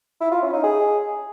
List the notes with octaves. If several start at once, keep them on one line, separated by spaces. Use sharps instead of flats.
E4
F4
C#4
D#4
G#4